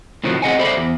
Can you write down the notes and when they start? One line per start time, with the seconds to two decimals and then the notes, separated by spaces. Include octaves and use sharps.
0.24 A2 C3 D#3 F3 F#3
0.42 C4 G#4 D#5 F#5 G#5
0.59 G4 A4 C5 D5 E5 B5
0.77 E2